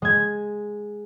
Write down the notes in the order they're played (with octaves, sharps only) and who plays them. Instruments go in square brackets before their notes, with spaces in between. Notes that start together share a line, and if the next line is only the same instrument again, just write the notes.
[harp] G#3 G#6